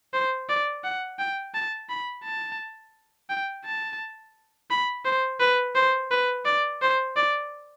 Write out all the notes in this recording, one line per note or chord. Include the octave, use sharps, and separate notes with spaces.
C5
D5
F#5
G5
A5
B5
A5
G5
A5
B5
C5
B4
C5
B4
D5
C5
D5